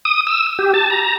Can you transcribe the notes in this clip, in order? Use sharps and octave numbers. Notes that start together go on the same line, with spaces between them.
D#6
E6
G4
A5
A#5